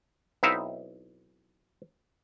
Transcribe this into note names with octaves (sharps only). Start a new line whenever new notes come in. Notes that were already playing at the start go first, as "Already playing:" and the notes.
B1 C4 D#4 E4 E5 F5